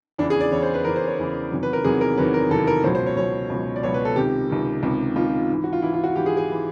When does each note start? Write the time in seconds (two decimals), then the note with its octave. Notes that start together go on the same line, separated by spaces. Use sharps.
0.18 E2 C#3 E3 D4
0.30 G#4
0.41 D5
0.52 E2 C#3 E3 C#5
0.63 C5
0.74 B4
0.85 E2 C#3 E3 A#4
0.96 C5
1.07 C#5
1.18 E2 C#3 E3
1.51 E2 C3 D#3 F#3
1.63 B4
1.73 A#4
1.84 E2 C3 D#3 F#3 G#4
2.01 A#4
2.17 E2 C3 D#3 F#3 B4
2.34 A#4
2.50 E2 C3 D#3 F#3 A4
2.67 A#4
2.84 C#2 B2 F#3 C5
2.95 C5
3.06 C#5
3.17 C#2 B2 F#3 C#5
3.50 C#2 B2 F#3
3.76 D5
3.83 C#2 B2 F#3 C#5
3.94 B4
4.05 A4
4.16 C#2 C3 D#3 G4
4.49 C#2 C3 D#3
4.82 C#2 C3 D#3
5.16 C#2 C3 D#3 F4
5.49 G#2 E3
5.64 F#4
5.73 F4
5.82 G#2 E3 E4
5.93 F4
6.04 F#4
6.15 G#2 E3 G4
6.26 G#4
6.37 G#4
6.51 E3